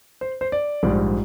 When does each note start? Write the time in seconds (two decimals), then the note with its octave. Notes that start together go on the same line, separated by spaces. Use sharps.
0.21 C5
0.41 C5
0.52 D5
0.83 A#1 G#2 G3